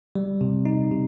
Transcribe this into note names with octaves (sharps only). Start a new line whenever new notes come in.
G3
C3
D#4
C3